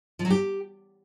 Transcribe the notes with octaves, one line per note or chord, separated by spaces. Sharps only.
F3
F#3
G4